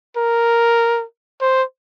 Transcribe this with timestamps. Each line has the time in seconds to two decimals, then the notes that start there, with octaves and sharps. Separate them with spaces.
0.17 A#4
1.41 C5